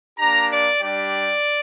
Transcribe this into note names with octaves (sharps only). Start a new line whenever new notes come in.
A#3 D4 G4 A#5
D5
G3 D4 G4 D5